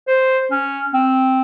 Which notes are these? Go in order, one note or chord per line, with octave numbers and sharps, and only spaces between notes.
C5
C#4
C4